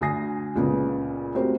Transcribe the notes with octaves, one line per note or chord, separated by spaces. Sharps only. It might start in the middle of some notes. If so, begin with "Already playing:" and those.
D2 D3 G#5 D#6 A#6 C7
C#2 A#2 C#3 B3
A3 C4 F#4 G4 A#4 C5